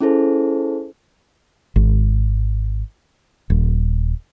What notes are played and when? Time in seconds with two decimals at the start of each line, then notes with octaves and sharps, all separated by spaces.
0.01 C#4 E4 G#4 A4 C5
1.76 G#1
3.50 D#1